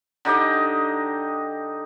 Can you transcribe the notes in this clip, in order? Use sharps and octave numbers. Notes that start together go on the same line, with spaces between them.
D3 D#4 G4 D#5